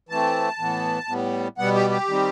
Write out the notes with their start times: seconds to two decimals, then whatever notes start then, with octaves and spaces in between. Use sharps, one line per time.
0.09 E3 A3 C4 A5
0.59 A2 E3 B3
1.08 A2 G3 B3
1.58 B2 G3 B3 F#5
1.74 G4
1.91 G4
2.08 D#3 G3 C4